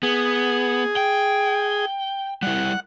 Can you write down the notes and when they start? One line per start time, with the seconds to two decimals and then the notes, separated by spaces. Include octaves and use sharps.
0.03 B3 G#4
0.96 G5
2.42 G3 E4 F#5